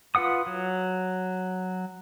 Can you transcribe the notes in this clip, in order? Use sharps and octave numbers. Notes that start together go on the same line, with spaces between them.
F4 B4 F#5 D#6
F#3